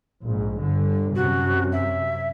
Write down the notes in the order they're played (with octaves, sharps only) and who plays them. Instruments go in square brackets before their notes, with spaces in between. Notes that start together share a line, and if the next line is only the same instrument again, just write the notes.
[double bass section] A#1 G#2
G1 D3
[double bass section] F#2 C3 [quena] F#4
[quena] E5